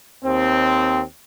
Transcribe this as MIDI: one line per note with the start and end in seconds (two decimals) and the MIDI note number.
0.24 1.01 39
0.24 1.01 60